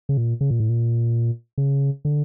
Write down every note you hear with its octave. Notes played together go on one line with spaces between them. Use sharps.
C#3
A#2
C#3
A#2
A2
A#2
C#3
D3